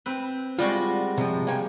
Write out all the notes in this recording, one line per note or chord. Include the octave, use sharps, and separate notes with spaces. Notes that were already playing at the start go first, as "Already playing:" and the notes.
C4 B4
G3 G#3 F4 F#4
C3 F3
A#3 G5 G#5